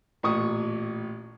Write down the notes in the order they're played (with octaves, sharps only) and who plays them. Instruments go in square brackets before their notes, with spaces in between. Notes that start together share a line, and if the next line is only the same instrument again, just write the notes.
[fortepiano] A1 A#2 C#6 D#6